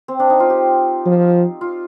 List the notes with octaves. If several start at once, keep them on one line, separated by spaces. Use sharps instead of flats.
C4
D4
D#4
F4
G4
F3
F4